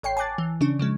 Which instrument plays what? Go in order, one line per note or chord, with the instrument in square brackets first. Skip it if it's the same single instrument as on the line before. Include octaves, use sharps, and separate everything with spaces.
[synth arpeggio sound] A1 C#5 G5 C7
G#5 A5 D6 F#6 A6
E3
C#3 C#4 D4
C#3 F3 G#3